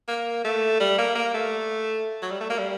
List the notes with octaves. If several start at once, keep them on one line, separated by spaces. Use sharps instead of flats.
A#3
A3
G3
A#3
A#3
A3
F#3
G3
A3
A#3
G3